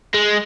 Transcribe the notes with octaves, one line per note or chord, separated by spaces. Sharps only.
G#3